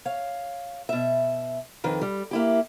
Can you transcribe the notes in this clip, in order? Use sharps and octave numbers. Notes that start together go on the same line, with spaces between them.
C#5 F5
B2 E5
F2 D#3 B4
G3
A#3 E4 G4